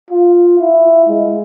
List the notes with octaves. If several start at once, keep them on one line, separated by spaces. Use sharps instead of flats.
F4
E4
G#3